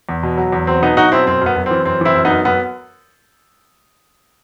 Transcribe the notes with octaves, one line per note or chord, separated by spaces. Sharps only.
E2
B2
F#3
E2
F#3 C4
B2 B3 D#4
F#3 D#4 F#4
B2 C4 E4
F#2 C4
F#2 B3
F#2
E3 C4
F#2 C4
E3 C4 E4
F#2
B3 D#4
F#2
F#2 B3